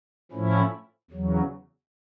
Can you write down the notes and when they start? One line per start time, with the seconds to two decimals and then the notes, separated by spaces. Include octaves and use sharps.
0.32 A2 F3 A3 C#4 E4
1.11 E2 C#3 F#3